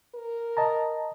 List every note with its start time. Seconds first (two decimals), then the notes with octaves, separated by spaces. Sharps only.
0.15 A#4
0.57 D#5 A5 A#5